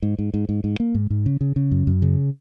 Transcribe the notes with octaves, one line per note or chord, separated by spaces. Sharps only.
G#2
G#2
G#2
G#2
G#2
A#3
G#2
G#2
C#3
C#3
C#3
F#2
F#2
C#3